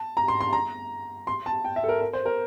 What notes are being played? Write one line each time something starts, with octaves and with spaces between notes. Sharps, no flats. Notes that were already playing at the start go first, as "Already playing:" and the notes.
Already playing: A5
A#5
C6
C6
A#5
C6
A5
G5
E5
A4
A#4
A#4
C5
A#4